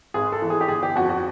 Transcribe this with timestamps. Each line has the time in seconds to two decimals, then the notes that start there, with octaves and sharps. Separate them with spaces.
0.14 G#1 G#4
0.32 A4
0.42 E3
0.50 G#4
0.61 G4
0.68 G1 G#4
0.83 G4
0.96 F2 F#4
1.09 F#4